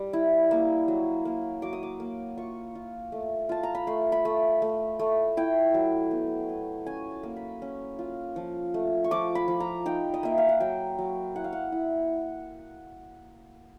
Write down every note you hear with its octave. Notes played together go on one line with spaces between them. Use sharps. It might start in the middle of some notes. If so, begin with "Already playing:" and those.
Already playing: G3
E4
A#3
F#3
A#3
F#3 D6
D#6
D6
A#3
F4 C#6
F4
A3
F4 A5
A#5
B5
A3 C6
B5
A3
A3
A3
E4 G5
F#3
B3
B3
C#4 G#5
A5
A#3
B5
C#4
F4
F3
A3
C#6
F3 D6
B5
F3
A#5
D#4 G5
D#5
A#3 E5
F5
F#5
F#3 G5
F#3
E4 F#5
F5
F#5
E4